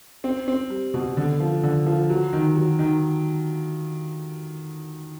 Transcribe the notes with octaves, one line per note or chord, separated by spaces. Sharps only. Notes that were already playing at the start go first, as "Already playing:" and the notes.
C4
C4
G3
B2
D3
F3
D3
F3
F#3
D#3
F#3
D#3